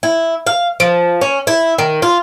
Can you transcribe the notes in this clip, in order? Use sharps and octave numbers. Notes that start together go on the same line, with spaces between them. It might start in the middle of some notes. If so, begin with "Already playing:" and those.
E4
F5
F3
C#4
E4
D#3
F4